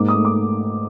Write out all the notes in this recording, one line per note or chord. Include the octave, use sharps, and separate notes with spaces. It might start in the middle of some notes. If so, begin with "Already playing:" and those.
Already playing: G#2 A#3 D6
D#6
A3
D6